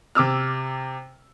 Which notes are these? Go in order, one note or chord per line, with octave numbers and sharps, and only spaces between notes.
C3 D6 E6 F6